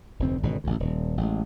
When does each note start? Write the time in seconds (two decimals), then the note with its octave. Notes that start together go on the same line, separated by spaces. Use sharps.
0.19 F1 D2 C4
0.43 G#1 G#2 B2 D3
0.64 A1 D2
0.80 D#1
1.17 A1 G#3